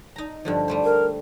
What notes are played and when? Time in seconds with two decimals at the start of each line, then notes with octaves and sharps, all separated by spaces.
0.16 D#4 A#5
0.45 G2 D3 F3
0.68 G3 A3 C5
0.84 A#4